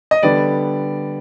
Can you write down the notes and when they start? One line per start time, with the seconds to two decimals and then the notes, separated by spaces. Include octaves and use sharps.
0.11 D#5
0.23 D3 G3 B3 D5